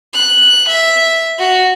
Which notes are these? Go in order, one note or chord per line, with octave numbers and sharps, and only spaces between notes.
F#6
E5
F#4